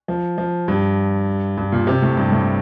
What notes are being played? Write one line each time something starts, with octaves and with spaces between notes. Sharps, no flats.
F3
F3
G2
G2
A#2
C3
A2
G2
A2